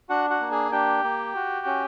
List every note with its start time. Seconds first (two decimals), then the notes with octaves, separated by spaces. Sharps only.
0.09 D4 F#4 F#5
0.30 F#4 F#5
0.41 A#3
0.51 G#4 G#5
0.72 D4 G4 G5
1.04 A#3
1.35 F#4
1.66 C#4